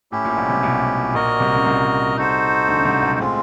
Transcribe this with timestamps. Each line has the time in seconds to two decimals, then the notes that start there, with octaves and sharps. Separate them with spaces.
0.12 A2 C#4 E4 G4
0.25 A#1 A#2
0.37 B1 B2
0.50 C2 C3
0.63 B1 B2
1.14 A#1 A#2 F#4 A#4 D#5
1.40 C2 C3
1.56 C#3
1.65 C2 C3
2.17 D#4 F#4 A4 C5
2.68 D2 D3
2.76 C#3
2.85 C2 C3
3.02 B1 B2
3.19 A2 G#3 C4 F4